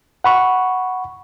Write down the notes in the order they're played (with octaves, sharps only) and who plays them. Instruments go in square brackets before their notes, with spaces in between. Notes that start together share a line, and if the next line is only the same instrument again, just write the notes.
[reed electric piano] F#5 B5 C#6